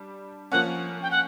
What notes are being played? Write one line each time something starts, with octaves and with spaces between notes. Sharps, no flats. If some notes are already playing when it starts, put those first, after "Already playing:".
Already playing: G3 D4
F3 A#3 C#4 F#5
G5
F#5